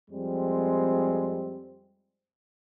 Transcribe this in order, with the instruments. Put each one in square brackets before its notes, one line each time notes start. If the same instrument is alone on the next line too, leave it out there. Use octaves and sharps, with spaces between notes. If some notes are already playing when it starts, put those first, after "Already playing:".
[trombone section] F2 G3 G#3 C4